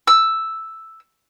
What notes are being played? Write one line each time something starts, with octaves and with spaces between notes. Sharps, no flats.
E6